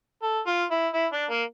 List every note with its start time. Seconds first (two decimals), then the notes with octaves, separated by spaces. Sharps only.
0.23 A4
0.47 F4
0.71 E4
0.94 E4
1.13 D4
1.30 A#3